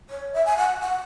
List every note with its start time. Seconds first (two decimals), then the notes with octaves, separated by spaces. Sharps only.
0.10 C#5
0.33 E5
0.46 G#5
0.58 F#5
0.80 F#5